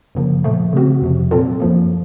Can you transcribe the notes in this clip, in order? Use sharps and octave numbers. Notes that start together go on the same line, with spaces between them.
F#2 C#3 F3 A#3
A#2 F3 A3
C#3 A3 C4 F#4
F2 C3 F3
A#2 F#3 C4 F4 A4
F#2 F3 A#3